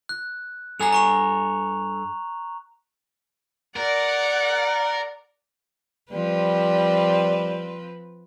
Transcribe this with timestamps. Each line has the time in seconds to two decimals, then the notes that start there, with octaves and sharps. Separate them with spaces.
0.09 F#6
0.80 G2 A4 G#5 A#5 F7
0.93 A#5 C#6 F7
3.76 A#4 D5 F#5
6.12 F3 G3 C4 B4